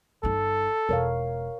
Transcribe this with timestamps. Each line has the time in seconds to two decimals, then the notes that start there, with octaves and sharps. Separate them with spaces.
0.23 G1 D#4 A4
0.89 E1 A#4 C#5 F5